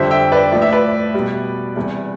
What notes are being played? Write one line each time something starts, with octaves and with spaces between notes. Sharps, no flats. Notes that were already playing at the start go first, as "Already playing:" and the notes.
Already playing: F2 D3 G3 C5 E5
E5 G5
B4 D5
A2 F3 D5
E5
B4 D5
B2 G3
E2 C3 G3